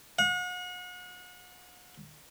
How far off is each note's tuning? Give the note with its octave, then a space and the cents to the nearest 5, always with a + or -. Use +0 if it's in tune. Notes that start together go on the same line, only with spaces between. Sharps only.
F#5 -40